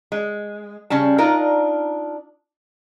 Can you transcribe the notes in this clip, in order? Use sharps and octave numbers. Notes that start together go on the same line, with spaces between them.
G#3
C#3 G3 C#4 A5
D4 D#4 F4 A#4